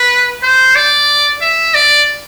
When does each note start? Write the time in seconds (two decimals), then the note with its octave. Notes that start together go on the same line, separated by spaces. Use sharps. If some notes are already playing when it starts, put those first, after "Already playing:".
Already playing: B4
0.43 C5
0.75 D5
1.41 E5
1.74 D5